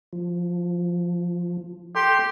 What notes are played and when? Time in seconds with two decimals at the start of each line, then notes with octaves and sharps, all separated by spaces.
0.13 F3
1.95 G4 A4 C6